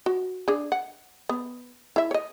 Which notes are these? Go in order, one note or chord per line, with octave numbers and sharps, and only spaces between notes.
F#4
D4 G#4
F#5
B3
E4 E5
C#5 D#5